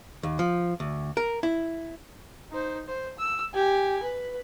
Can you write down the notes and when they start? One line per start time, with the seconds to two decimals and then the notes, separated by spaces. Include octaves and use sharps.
0.23 D#2
0.39 F3
0.80 D2
1.17 A#4
1.43 E4
2.52 D#4 C5
2.87 C5
3.19 E6
3.54 G4 G#5
4.03 B4